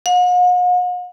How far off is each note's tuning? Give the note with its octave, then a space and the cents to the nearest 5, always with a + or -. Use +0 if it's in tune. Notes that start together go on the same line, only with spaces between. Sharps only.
F#5 -45